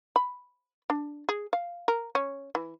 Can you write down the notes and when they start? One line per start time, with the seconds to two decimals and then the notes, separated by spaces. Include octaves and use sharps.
0.16 B5
0.90 D4
1.29 G#4
1.53 F5
1.88 A#4
2.15 C#4
2.55 E3